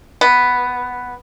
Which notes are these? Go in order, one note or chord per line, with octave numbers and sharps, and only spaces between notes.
B3